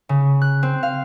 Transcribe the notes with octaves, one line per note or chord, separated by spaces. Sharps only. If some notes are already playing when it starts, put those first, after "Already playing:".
C#3
F#6
C4
F5